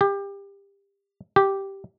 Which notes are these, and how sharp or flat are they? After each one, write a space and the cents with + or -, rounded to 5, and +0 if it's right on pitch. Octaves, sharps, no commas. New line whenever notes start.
G4 +25
G4 -5